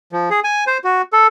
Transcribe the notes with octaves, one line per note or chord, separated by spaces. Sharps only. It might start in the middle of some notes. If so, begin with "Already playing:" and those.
F3
G#4
G#5
C5
F#4
A4